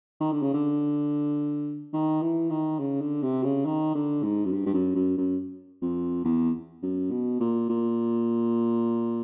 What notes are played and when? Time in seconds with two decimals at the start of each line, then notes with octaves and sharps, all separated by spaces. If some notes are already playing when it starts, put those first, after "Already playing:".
0.20 D#3
0.32 D3
0.42 C#3
0.54 D3
1.93 D#3
2.22 E3
2.50 D#3
2.79 C#3
3.01 D3
3.23 C3
3.44 C#3
3.65 D#3
3.95 D3
4.23 G#2
4.45 F#2
4.53 G2
4.66 G2
4.74 F#2
4.95 F#2
5.17 F#2
5.82 F2
6.25 E2
6.83 F#2
7.11 B2
7.41 A#2
7.69 A#2